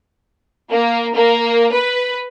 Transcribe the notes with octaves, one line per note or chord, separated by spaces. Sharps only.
A#3
A#3
B4